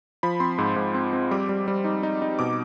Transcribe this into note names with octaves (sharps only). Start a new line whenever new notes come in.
F3 B5
C4 C6
G#2
G#2
C4
C4
G3 D6
G3
G3
D#4
D#4
D#4
B2 D6